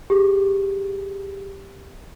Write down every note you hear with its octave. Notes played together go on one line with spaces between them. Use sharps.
G4 G#4